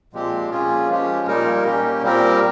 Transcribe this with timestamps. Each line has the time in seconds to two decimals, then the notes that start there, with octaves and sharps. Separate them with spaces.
0.13 A#2 F3 G#3 C4 G4
0.50 A#3 C#4 F4 G#4
0.89 F3 G#3 C#4 G4
1.27 A#2 G3 A#3 D#4 A#4
1.64 A#3 C#4 G4
2.02 A#2 G3 C4 G4 A#4